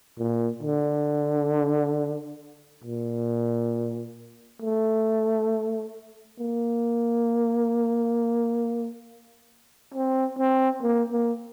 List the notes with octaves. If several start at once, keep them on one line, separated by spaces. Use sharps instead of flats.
A#2
D3
A#2
A3
A#3
C4
C4
A#3
A#3